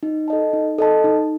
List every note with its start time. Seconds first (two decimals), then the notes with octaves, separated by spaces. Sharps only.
0.03 D#4
0.28 A4 D#5 A5
0.53 D#4
0.78 A4 D#5 A5
1.04 D#4